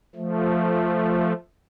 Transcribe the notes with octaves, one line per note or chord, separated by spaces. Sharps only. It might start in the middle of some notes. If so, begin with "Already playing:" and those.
F3 A3